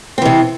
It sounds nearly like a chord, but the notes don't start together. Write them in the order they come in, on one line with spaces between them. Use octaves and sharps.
C4 E3 C3